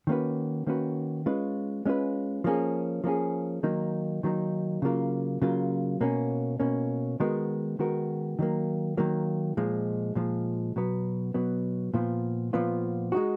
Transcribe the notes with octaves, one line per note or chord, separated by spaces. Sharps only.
D#3 A#3 C#4 F#4 B4
D#3 A#3 C#4 F#4 B4
G#3 C#4 F4 B4
G#3 C#4 F4 B4
F3 A#3 C#4 G#4
F3 A#3 C#4 G#4
D#3 F#3 A#3 D#4
D#3 F#3 A#3 D#4
C#3 F#3 A#3 F4
C#3 F#3 A#3 F4
B2 A#3 C#4
B2 A#3 C#4
D#3 G#3 B3 F#4 A#4
D#3 G#3 B3 F#4 A#4
D#3 F#3 A#3
D#3 F#3 A#3
A#2 F3 G#3
A#2 F3 G#3
B2 F#3 B3
B2 F#3 B3
A#2 F3 B3 F4
A#2 F3 B3 F4
G#3 D#4 F#4